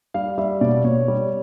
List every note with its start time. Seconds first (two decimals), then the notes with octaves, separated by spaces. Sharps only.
0.14 G3 F5
0.38 G3 E5
0.61 B2 D5
0.84 B2 C#5
1.08 G3